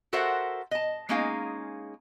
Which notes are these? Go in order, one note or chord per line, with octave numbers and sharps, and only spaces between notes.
F#4 A4 A#4 C5 E5 F#5
D#5 A5
G#3 A#3 C#4 D#4 G#4 F5